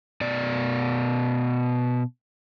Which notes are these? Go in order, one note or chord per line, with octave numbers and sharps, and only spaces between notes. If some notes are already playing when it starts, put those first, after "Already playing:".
B2 D5